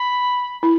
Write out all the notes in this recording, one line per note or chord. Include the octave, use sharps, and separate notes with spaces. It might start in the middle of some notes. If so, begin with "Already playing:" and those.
Already playing: B5
E4